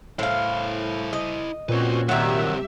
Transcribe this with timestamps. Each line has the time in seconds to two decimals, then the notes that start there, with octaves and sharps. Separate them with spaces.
0.19 A2 E4 C5 F5
1.13 D#5
1.69 A#2 C4 C#4 F#4 B4 C#5
2.09 G2 C3 D#3 F#3 G4 E5